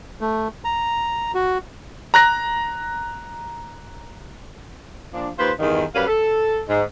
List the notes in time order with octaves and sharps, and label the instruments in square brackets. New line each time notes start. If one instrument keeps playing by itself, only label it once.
[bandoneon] A3
A#5
F#4
[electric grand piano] A#5 F#6 A#6
[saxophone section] A#2 F3 D4
D#2 F4 B4 C5
E2 G2 D#3
F#2 G3 B4 F5
A4
G#2